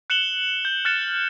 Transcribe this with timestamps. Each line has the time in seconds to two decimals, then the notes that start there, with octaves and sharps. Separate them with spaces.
0.10 F#6 C#7 E7 F#7 G7
0.65 G6
0.85 F6 F#6 A6 C#7 E7